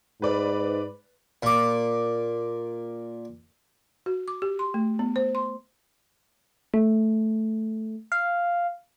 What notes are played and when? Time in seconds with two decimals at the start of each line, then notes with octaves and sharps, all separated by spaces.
0.22 G#2 B4 D5 B5
1.43 A#2 D6
4.06 F#4
4.28 D6
4.42 G4
4.59 C6
4.74 A3
4.99 B3
5.16 C5
5.35 C6
6.74 A3
8.12 F5